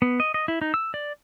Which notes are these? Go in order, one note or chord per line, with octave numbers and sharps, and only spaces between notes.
B3
D#5
D#5
E4
D#4
E6
D5